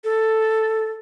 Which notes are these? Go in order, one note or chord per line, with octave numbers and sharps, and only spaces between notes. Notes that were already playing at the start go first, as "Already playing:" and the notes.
A4